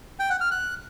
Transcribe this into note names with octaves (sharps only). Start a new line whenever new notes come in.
G5
F#5
F6
F#6